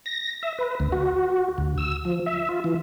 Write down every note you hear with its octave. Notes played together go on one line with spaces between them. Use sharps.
A#6
E5
B4
D2
F#4
D2
E6
F3
E5
F4
E3